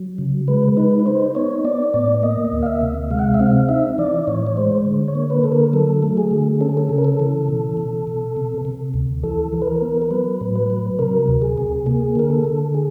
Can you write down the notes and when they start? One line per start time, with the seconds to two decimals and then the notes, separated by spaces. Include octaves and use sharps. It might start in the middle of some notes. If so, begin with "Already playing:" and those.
Already playing: F#3
0.18 C#3
0.48 G#3 B4
0.77 D#4 B4
0.99 B4
1.06 D#4 C5
1.35 B3 C#5
1.65 B3 D5
1.94 A2 D5
2.23 A#3 D#5
2.52 D2
2.63 F5
2.66 E5
2.81 C3
3.11 G#3 F5
3.19 F#5
3.29 F5
3.34 E5
3.40 C4 F5
3.69 D#4 E5
3.98 E3 D5
4.27 A2 C#5
4.47 C#5
4.57 G#3 C5
4.86 D3
5.08 C#5
5.15 A#3
5.30 B4
5.44 D3 A4
5.52 A#4
5.73 F#3 A4
6.03 A3
6.17 G#4
6.31 D3
6.61 C#4 A4
6.69 G#4
6.77 A4
6.89 C#3
6.98 A#4
7.05 A4
7.20 E3
7.49 B2
7.77 B2
8.07 B2
8.37 C3
8.65 C3
8.94 D2
9.23 E3 A4
9.52 E3
9.62 B4
9.67 A#4
9.82 B3
10.02 A#4
10.11 F#3 B4
10.41 A2
10.56 B4
10.70 F#3
10.99 C3 A#4
11.28 D2
11.42 G#4
11.58 C3
11.86 A#3 G#4
12.15 D3 A#4
12.31 A4
12.45 D3
12.74 G#4